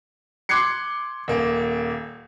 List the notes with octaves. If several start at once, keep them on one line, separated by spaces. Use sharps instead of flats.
C6 D6 F#6 G#6 C7 C#7
D#1 A#3